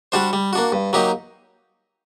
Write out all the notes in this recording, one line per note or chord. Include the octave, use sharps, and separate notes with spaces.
G3 D4 F#4 C5
G3
A#3 D4 F#4
G2
F#3 A#3 D#4 G4